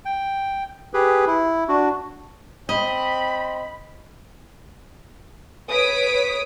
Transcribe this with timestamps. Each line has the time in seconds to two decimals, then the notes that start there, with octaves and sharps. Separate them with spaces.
0.05 G5
0.94 G4 G#4 B4
1.27 E4
1.68 D4 F#4
2.69 C4 D#5 B5
5.69 B4 C#5 D#6 B6 D7